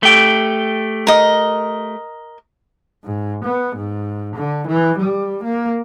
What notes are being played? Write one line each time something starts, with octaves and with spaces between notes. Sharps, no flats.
A3 G4
A#4 D#5
G#2
B3
G#2
D3
E3
G3
A#3